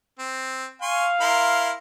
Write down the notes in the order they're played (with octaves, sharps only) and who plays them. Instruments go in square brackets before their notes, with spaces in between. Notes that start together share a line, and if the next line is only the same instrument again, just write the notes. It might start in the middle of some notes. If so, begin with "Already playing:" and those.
[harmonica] C4
[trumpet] F5 [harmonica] G#5 C6 C#6
[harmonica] E4 A#4 C6